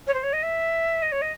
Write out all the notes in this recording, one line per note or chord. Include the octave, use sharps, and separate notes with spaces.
C#5
C5
C#5
D#5
E5
D#5
C#5
D#5